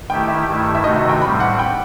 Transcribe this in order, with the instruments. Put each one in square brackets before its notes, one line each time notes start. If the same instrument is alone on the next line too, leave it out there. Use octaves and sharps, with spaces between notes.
[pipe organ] D#3 A3 E4 G4 [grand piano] G5
[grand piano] E5
[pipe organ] G2 D#3 A3 E4
[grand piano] E5
[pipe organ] C3 D#3 A3 D#4 F#4 [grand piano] D#5
[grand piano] E5
G5
[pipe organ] A2 G3 C4 [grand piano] B5
[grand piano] F#5
G5